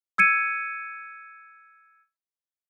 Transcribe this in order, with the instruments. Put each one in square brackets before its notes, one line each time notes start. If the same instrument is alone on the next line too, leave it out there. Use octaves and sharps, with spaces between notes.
[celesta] E6 G#6 C#7 D#7